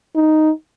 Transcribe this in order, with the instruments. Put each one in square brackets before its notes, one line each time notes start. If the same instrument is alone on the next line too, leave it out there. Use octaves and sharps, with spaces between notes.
[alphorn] D#4